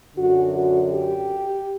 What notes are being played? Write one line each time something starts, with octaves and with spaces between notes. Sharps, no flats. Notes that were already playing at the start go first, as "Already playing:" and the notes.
F#2 D3 F#4
F#4
G4